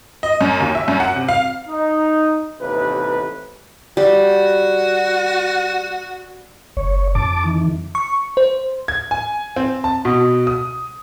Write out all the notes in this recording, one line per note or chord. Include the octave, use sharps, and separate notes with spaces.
D#5
F#2
D#2
E5
F#2
F#5
C3
F5
D#4
A1 D#2 C3 B4
G3 F#4
F#1 C#5
F2 A5 D6
D#3 E3
C#6
C5
G#6
G#5
C4
A5
B2
D#6